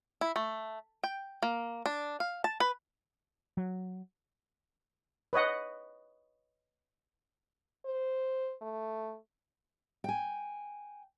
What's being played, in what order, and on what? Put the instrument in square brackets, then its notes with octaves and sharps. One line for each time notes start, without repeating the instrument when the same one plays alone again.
[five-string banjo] E4
A3
G5
A#3
D4
F5
A5
B4
[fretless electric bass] F#3
[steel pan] B4 C#5 D#5 F#5
[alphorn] C5
A3
[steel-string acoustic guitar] G5 G#5